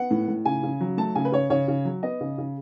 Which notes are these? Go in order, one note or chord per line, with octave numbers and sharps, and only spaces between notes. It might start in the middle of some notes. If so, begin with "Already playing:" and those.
Already playing: B3 F#5
A2
A2
C#3 G#5
C#3
F#3
A3 A5
C#3 G#5
B4
C#3 C#5
C#3 C#5
C#3
F#3
B3 D#5
C#3
C#3